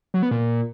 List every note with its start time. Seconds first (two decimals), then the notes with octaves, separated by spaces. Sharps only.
0.14 F#3
0.23 B3
0.31 A#2